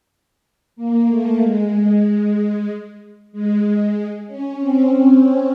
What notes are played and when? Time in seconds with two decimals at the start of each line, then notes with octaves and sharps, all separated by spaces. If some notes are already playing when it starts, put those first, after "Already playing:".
0.76 A#3
1.08 A3
1.40 G#3
3.32 G#3
3.96 G#3
4.28 C#4
4.59 C4